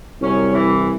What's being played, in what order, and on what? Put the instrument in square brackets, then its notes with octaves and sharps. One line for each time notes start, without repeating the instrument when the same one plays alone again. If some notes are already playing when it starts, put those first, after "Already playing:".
[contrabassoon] C2 [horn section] F#2 C#4
[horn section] E3